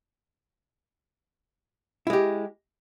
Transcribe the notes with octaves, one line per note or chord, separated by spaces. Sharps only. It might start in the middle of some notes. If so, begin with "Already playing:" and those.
G#3 E4 G4